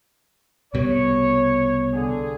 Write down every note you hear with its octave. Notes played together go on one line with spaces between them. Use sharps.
C2 B2 G3 C#5
D3 G#4